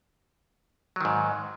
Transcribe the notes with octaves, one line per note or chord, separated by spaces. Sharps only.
G#2 D#3 F#3